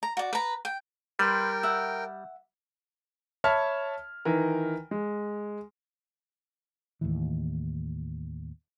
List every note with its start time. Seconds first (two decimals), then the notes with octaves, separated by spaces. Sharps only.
0.03 A#5
0.17 F#4 D5
0.33 B4 A#5
0.65 G5
1.19 G3 A#4 B4 G5 C6
1.63 E5 F#5
3.44 C#5 E5 A5 B5 F6
4.25 D#3 E3 A#4
4.91 G#3
7.01 D#2 A2 E3